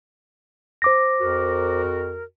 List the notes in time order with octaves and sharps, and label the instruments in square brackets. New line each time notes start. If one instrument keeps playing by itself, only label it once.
[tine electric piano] C5 D6 A#6
[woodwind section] F2 F#4 A#4